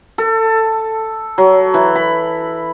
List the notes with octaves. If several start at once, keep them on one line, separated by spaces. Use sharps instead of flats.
A4
F#3
E3
B5